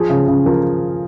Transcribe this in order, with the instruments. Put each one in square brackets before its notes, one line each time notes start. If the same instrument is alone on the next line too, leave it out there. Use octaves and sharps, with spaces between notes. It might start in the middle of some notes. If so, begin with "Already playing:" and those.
Already playing: [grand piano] F3 G#4
C#3
C#3
F3 A#4